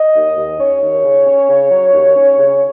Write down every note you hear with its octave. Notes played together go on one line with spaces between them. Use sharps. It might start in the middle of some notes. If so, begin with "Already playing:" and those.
Already playing: D#5
D#2
D#2
C#4 C#5
D#2
C#3
C#4
C#3
F#3
D#2
C#4
C#3